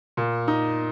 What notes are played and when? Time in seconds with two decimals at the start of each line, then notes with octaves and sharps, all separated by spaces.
0.17 A#2
0.48 D#4